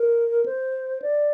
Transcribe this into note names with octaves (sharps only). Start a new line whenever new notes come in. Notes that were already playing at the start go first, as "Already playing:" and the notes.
Already playing: A#4
C5
D5